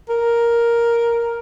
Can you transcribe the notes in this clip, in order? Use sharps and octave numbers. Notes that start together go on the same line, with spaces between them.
A#4